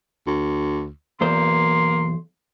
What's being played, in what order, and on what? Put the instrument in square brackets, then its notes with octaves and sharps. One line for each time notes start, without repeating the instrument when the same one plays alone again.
[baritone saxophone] D2
[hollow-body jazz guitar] B1 E2 C5 [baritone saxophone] A#3 [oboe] C6